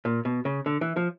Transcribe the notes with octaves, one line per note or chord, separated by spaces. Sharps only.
A#2
B2
C#3
D3
E3
F3